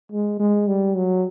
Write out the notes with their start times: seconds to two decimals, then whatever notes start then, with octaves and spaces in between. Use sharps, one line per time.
0.12 G#3
0.39 G#3
0.67 G3
0.96 F#3